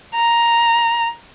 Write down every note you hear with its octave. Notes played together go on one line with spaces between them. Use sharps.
A#5